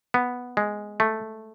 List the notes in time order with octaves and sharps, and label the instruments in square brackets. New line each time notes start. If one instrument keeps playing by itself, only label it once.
[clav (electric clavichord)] B3
G#3
A3